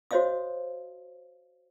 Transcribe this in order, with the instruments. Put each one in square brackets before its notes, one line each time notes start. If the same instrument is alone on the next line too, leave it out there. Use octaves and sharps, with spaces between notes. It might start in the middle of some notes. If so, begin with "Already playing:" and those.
[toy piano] F#4 C5 C#5 D#5 F5 D#6